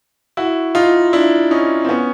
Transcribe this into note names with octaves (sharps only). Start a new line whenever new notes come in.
E4 F#4
D#4 F4
D4 E4
C#4 D#4
C4
B3 C#4